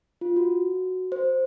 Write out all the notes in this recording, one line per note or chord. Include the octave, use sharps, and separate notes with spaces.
F4
F#4
C5